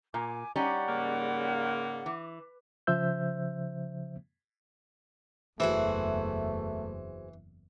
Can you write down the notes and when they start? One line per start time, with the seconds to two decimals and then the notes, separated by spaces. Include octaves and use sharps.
0.14 A#2 G#5 D6
0.56 G3 C#4 D#4 D5 F#5
0.88 G#2 C#3 A#3
2.06 E3
2.87 C#3 F3 C5 E5 E6 G6
5.60 F#1 E2 E3 A3 F#4 G#4 C5